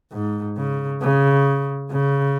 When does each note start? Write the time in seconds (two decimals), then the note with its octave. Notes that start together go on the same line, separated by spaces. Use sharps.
0.12 G#2
0.57 C#3
1.01 C#3
1.92 C#3